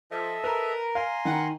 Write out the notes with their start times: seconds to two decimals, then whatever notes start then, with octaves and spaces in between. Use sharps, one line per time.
0.11 F3 A4 D#5 E5
0.44 A#4 B4
0.95 F5 G#5 A#5 C6
1.25 D#3 B4 F#5